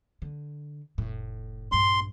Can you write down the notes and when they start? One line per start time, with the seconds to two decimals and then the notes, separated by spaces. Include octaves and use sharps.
0.22 D3
0.98 F1 A2
1.72 A#1 G2 C6